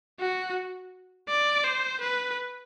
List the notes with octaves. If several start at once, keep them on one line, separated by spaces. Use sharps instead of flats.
F#4
D5
C5
B4